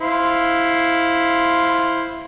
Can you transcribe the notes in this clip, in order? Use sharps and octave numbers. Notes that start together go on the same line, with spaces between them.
E4 C5 F5